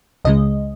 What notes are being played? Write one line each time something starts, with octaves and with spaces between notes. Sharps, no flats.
C#2 C#3 G#3 D#5